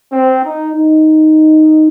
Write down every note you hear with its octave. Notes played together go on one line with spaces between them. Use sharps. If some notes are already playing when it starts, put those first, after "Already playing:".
C4
D#4
D#4